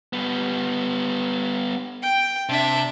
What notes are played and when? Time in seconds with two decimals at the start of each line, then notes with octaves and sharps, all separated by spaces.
0.13 G3 B3
2.03 G5
2.49 C3 D4 E5